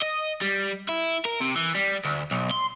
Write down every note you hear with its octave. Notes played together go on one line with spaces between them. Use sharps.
D#5
G3
E4
A#4
C3
E3
G3
D2
B1
C6